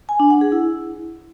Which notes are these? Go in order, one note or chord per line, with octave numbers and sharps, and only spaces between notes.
G#5
D4
F#5
G#4
E4